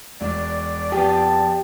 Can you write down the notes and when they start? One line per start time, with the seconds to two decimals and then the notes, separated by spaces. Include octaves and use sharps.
0.21 E1 D5
0.92 F2 B3 G4 G#4 A5